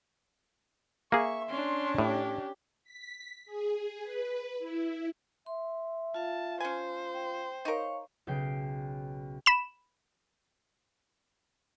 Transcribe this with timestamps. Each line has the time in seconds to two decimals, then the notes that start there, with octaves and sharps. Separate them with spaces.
1.12 A#3 G#4 E5 C#6
1.49 C#4 D4 C6
1.98 A2 G4
2.84 B6
3.46 G#4
4.02 B4
4.59 E4
5.46 E5 C6
6.14 F4 F5 A5
6.60 C#4 C5 G#5
7.14 G5
7.65 D#4 A#4 C#5 F5 C#6
8.27 B1 C#3 G5 C7
9.46 B5 E7